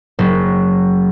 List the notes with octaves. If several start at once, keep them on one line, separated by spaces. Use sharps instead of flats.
F#1